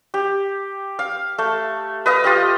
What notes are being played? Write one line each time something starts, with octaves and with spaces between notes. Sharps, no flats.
G4
F5
A3
B4 D#5 F5 D#6
F4 G4 D#5